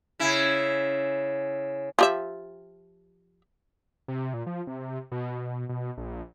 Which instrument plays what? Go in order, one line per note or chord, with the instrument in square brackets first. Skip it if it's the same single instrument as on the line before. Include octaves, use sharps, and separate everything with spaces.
[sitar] C#3 E4
[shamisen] F3 G4 E5
[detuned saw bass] C3
A#2
F3
C3
B2
B2
A#1